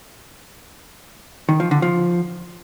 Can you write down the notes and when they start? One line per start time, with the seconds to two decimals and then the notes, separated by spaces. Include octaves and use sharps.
1.49 D#3
1.60 F3
1.71 D3
1.82 F3